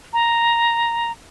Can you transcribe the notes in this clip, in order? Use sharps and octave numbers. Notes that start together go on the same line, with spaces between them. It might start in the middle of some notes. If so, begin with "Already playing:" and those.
A#5